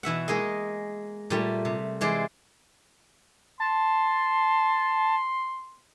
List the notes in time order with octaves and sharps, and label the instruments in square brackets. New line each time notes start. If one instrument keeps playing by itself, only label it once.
[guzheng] B2 E3 E5 F#5
G#3 A#3 G#4 D#5
A#2 G3 A3
C3
E3 G#3 C5 D5
[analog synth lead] A5 [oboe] C6